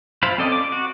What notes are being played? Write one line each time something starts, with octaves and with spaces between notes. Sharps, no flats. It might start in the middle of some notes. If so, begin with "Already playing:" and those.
E4 F4 C5 F5 B5
C4 C#4 A4 D5 D#5
D6
F#4